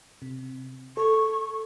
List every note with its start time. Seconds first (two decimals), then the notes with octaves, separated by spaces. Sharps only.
0.22 C3
0.97 A4 C#6